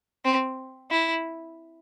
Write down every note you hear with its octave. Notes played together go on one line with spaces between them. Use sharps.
C4
E4